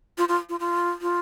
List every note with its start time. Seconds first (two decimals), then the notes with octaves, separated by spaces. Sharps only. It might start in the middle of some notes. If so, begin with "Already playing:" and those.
0.18 F4
0.29 F4
0.49 F4
0.60 F4
1.02 F4